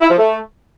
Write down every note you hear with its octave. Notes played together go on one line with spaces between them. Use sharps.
E4
F3
A3